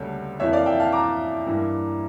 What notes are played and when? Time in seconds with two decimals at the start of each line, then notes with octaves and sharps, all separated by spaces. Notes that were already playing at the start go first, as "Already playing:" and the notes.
Already playing: D2 C#3 G3 A#3 A4 C#5
0.40 F2 E3 A#3 C#5 E5
0.53 D5 F5
0.66 E5 G5
0.80 F5 A5
0.92 A#5 D6
1.47 G2 E3 A#3 E4